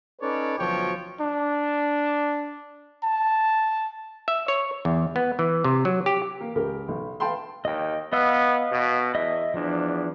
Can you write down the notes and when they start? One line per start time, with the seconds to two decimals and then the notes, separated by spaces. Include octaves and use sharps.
0.22 C#4 D#4 A4 B4 C#5 D5
0.59 D2 B2 F3 F#3 C#5 G5
1.20 D4
3.04 A5
4.28 E5
4.48 C#5
4.85 E2
5.16 B3
5.39 E3
5.64 C3
5.85 F#3
6.06 G4
6.41 A#3
6.55 C#2 G4 A#4
6.88 B1
7.20 B4 F5 G5 A5 B5 C6
7.65 D#2 D#5 G5
8.13 B3 D#5 F5 E6
8.72 B2
9.15 E2 D#5 E5
9.54 E2 F3 D4